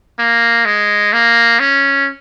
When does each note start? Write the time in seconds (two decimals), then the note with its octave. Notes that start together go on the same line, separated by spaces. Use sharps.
0.19 A#3
0.65 G#3
1.13 A#3
1.60 C#4